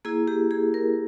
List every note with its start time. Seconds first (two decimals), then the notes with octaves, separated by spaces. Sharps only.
0.05 A#3 E4 G#4
0.28 G4
0.51 G#4
0.74 A#4